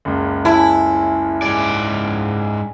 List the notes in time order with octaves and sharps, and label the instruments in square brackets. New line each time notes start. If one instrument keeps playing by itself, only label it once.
[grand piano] F#1 C#2
[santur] A3 C#4 G#4 [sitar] E4
[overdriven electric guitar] G#2 D5 [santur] G3 G#4